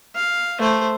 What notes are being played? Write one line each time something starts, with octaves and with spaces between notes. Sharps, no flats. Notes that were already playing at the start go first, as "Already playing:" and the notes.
F5
A3 C5